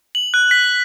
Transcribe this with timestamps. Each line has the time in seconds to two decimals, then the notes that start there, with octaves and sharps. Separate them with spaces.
0.15 F#7
0.34 F#6
0.51 B6